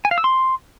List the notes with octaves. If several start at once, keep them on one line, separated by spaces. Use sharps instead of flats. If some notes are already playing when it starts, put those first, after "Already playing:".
G#5
F5
E6
C6